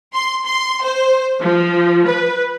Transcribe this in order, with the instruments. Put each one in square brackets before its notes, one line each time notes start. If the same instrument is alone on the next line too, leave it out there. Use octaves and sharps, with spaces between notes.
[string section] C6
C6
C5
F3
B4